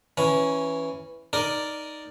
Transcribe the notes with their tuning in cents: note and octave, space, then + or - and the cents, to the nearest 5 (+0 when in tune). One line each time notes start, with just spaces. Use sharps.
E3 +0 C#4 +0 A#5 +45
D#4 +0 A#4 +0 D5 +0